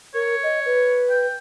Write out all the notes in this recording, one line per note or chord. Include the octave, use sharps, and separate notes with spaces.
A#4 C#5
D#5
B4
G5